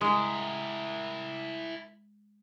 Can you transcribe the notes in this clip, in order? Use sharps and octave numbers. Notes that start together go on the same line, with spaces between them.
G#3 E4 A#4